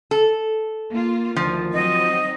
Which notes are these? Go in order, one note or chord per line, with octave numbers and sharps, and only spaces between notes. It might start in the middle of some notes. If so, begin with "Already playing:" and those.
A4
A#3 F4
D2 D#3 F3
F#3 C4 D#4 D#5